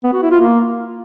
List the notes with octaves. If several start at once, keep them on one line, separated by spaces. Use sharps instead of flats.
B3
F#4
E4
F4
A#3